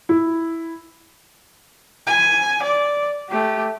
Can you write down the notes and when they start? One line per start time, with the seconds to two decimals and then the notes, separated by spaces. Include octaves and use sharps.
0.09 E4
2.07 G#5
2.63 D5
3.29 A3 G4